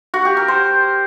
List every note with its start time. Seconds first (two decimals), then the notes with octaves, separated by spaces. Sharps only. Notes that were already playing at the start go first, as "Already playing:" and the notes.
0.14 F#4
0.25 G4
0.37 A#4
0.48 C5